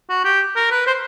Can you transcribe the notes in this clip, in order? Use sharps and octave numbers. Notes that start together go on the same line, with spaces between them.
F#4
G4
A#4
B4
C5